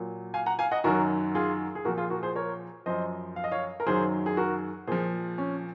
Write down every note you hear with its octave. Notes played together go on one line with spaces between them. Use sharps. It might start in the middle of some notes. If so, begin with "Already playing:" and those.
Already playing: A#2 F#3
F5 G#5
F#5 A#5
F5 G#5
D#5 F#5
F#2 D#3 F#3 F#4 A#4
F4 G#4
G#4
A#2 F3 F#4 A#4
F4 G#4
F#4 A#4
G#4 C5
A#4 C#5
F#2 F3 C5 D#5
F5
D#5
C#5 F5
A#4
F#2 D#3 F#3 G#4 C5
G#4
F#4 A#4
A#2 F3 G#4 C5
C#4